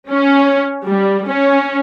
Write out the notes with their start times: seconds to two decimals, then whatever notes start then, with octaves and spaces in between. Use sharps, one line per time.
0.11 C#4
0.86 G3
1.29 C#4